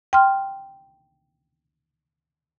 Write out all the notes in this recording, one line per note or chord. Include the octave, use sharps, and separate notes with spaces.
G5 C6 F6